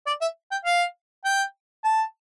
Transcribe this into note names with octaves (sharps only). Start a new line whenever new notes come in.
D5
E5
G5
F5
G5
A5